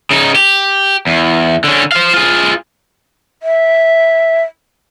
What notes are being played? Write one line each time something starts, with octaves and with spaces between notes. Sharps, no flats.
C#3 D#4
G4
E2
D3 C#4
C5 F5
F4 G#4
E5